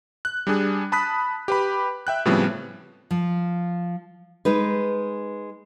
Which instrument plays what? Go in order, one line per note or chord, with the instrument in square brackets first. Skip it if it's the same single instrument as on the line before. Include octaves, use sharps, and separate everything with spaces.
[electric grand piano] F#6
G3 D4 G#4
A5 B5 D#6 F#6 B6
G4 B4 B5
E5 G5 F#6
A2 C#3 F3 G3 B3 C4
[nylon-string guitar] F3
G#3 D#4 B4